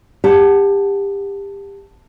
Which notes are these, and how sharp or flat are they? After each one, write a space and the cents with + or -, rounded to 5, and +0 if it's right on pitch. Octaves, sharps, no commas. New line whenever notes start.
G4 +25 F#5 +0 A5 +0